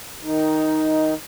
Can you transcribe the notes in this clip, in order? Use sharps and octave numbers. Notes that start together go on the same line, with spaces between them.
D#3 D#4